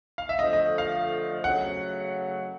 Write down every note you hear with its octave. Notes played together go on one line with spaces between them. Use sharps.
F5
E5
D3 F3 A3 D#5
D#5
F5
C#3 F#3 A3 F#5